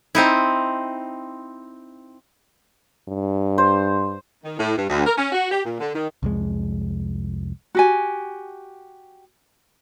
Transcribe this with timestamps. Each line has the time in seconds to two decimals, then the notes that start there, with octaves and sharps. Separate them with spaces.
0.15 C4 D#4 E4
3.09 G2
3.58 C5
4.44 D#3
4.59 A2
4.78 G2
4.90 D2
5.06 A#4
5.18 C#4
5.32 F#4
5.52 G4
5.65 A#2
5.80 D3
5.95 D#3
6.23 C2 F2 G#3
7.75 F#4 G4 G#5